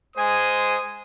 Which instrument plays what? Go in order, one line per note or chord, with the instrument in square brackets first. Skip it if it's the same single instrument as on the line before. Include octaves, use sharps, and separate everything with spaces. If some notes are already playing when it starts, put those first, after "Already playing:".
[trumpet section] G#3 C5 G#5 D#6